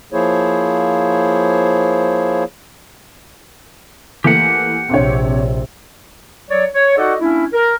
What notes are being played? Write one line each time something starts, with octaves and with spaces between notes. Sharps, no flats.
F3 A#3 E4 G#4 C5 C#5
E3 A3 A#3 G4 F#5
A#1 C3 C4 D4 C#5
F#3 C#5 D5
C#5
D#4 F#4 A4 D5 D#5 F#5
A#3 C#4 D4 E4
A#4